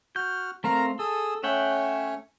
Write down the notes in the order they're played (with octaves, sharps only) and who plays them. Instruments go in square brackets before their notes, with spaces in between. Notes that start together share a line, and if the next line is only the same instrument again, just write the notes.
[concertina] F#4 F6 [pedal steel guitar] G6
[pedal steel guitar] A3 C4 F5 [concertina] A#4 A#5
[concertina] G#4 D#6 E6 [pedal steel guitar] A4
[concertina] A3 C#4 C#5 [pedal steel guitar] E5 F#5 G5